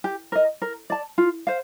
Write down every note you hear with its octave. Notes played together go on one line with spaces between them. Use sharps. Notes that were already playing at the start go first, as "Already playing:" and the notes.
G4
A#4 D#5
A#4
D5 A5
F4
C5 F5